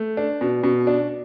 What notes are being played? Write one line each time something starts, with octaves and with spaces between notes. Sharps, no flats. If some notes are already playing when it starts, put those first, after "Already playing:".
Already playing: A3
D4
B2
B2
D4